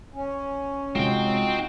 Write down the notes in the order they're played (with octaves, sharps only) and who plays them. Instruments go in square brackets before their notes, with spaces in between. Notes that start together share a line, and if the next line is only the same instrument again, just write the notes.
[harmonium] C#4
[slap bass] C3 G#3 [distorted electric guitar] C4 G5 [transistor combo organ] D#4 F4 F#4